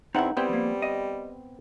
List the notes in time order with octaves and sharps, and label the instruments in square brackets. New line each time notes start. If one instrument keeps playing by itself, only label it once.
[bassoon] E2 [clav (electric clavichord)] C4 E4 [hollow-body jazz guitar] D#4 F#5
[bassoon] G3 [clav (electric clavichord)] B3 C4 [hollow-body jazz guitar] E4 G5
[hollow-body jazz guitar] F3 A#3
D#5